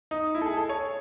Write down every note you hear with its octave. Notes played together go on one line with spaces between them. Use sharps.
D#4
E4
A4
G#4
A4
C#5